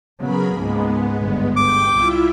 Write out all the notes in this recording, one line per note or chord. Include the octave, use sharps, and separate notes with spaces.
C#3 F#3 B3 G#4 A#4 B5
C#2 G#2 G#3 A#3 B3
G1
G5 D6
C2 E4 F4 E5